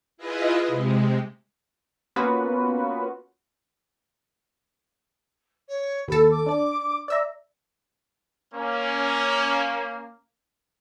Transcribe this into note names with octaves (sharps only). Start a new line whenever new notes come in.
E4 F4 G#4 B4 D#5
C3 G#3
A#3 B3 C#4 F4 F#4 B4
C#5
D#2 A4 B5
D6
D4 D5
D5 E5 A#5
A#3 C#4